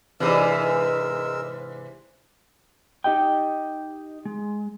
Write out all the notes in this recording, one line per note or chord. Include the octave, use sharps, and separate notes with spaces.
G#2 C3 E3 G#3 D4 D#4 A#4 E6
D#4 G4 D#5 G5
G#3